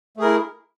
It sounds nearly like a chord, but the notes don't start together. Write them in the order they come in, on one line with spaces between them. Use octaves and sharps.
A3 G#4 A#4 E4